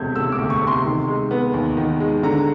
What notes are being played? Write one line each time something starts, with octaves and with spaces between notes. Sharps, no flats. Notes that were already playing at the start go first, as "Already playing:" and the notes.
Already playing: E1 D2 C3 G6 G#6
E1 E6
D6
D2
C#6
C3
C6
D#3
G#3
B3
D#2
D#3
G#3
D3 A#5